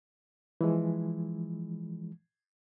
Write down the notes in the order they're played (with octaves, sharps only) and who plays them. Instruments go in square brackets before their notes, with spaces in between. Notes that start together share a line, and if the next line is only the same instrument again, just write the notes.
[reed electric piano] E3 F3 G#3